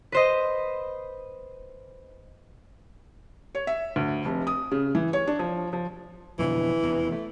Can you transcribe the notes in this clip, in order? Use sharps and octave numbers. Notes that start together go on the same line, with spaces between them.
B4 C5 D#5
C#5
E5
D2
F1
D#6
C#3
E3
C#5
D4
F3
F3
F2 B2 D3 E3
F1 E2
A3